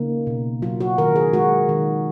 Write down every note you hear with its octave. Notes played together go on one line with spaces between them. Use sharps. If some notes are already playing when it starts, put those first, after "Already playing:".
Already playing: C#3 A#3 D#4
B2
F#3 F4
F#4
D#3 A#4
G#4
G#3 F#4
D#3